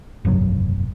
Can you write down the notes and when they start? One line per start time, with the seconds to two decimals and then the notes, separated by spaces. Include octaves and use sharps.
0.25 F1 B1 G2 F#3